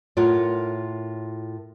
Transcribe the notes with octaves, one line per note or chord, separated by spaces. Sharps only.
A2 F4 A#4 C#5 F#5